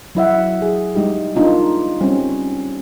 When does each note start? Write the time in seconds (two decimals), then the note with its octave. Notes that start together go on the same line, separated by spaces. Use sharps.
0.15 F#3 E4 E5 F#5
0.62 G#4
0.95 G3 G#3 D#4 G4
1.36 A#3 D4 D#4 F4
2.01 G3 C4 C#4